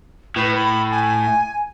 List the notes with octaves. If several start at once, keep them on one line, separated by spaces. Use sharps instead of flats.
A2 B4
B5
G#5